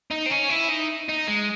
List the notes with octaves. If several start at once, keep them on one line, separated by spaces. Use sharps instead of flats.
D#4
C4
C#4
E4
D#4
D#4
G#3